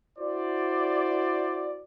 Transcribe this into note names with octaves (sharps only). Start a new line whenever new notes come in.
E4 F#4 C5 D5